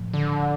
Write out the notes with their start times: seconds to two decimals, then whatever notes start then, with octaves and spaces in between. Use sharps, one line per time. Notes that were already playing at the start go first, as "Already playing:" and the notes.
Already playing: A2 F3
0.13 D3